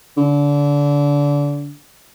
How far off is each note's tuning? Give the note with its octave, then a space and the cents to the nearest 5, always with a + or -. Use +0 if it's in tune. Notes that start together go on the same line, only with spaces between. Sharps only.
D3 -25